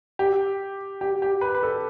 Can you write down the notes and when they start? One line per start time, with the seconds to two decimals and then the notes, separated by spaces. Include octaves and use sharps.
0.19 G4
1.01 G4
1.22 G4
1.41 B4
1.54 B4
1.63 A4